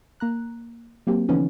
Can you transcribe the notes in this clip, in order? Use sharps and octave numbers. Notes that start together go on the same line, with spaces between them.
A#3 A#5 F#6
F#3 A#3 C4 G4
D3 E3 F3 B3 C#4 D#4